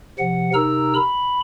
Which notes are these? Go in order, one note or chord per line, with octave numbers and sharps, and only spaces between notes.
C3 F3 F#5
C3 D#4 A#4 A#5 E6
B5